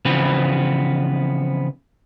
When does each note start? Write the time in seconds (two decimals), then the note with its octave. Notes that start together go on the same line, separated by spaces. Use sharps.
0.05 C#3 E3 F3 B3 C4 B4